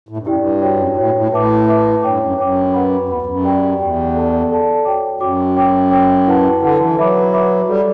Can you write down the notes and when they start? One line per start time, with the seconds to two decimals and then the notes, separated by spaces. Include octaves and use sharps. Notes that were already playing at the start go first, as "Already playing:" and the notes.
0.09 A2
0.17 G2
0.26 F#2 E4 G4 D5 G5
0.37 G2
0.62 F#4 C#5 G5
0.77 F#2
0.86 G2
0.97 A2 F#4 C#5 G5
1.14 A2
1.32 A2 B4 E5 A5 D6
1.67 B4 E5 A5 D6
2.03 G2 C#5 G5 D6
2.20 F#2
2.38 F#2 C#5 G5 D6
2.73 B4 F#5 B5
3.00 F#2
3.09 E2 B4 F#5 B5
3.22 E2
3.26 F#2
3.44 G4 D5 G5
3.79 E2 G4 D5 G5
4.15 A4 D5 A5
4.50 A4 D5 A5
4.85 F#4 C#5 G5 D6
5.20 F#2 F#4 C#5 G5 D6
5.56 C#5 G5 D6
5.91 C#5 G5 D6
6.27 E4 B4 F#5 A5
6.61 D3 E4 B4 F#5 A5
6.80 E3
6.97 F#3 B4 E5 B5 D6
7.32 B4 E5 B5 D6
7.68 G3 F#4 A4 D5